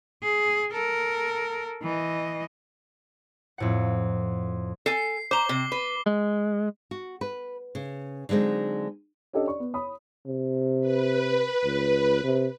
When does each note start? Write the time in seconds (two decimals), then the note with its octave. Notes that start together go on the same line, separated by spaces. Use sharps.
0.23 G#4
0.73 A4 A#4
1.83 E3 D#5
3.58 F2 A2 F#5
4.86 A4 G#5 C7
5.31 C5 A#5 D6 G7
5.49 C3
5.72 B4
6.06 G#3
6.91 F#4
7.21 B4
7.75 C#3
8.29 D3 F#3 G#3 C4 D#4
9.33 C#4 D4 G4 A4 D#5
9.47 D5 C#6
9.60 B3
9.74 C#5 B5 D#6
10.26 C3
10.81 B4
11.65 C#2
12.24 C3